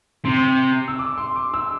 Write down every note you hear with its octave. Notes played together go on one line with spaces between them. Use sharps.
C3 C6
E6
D6
C6
D6
E6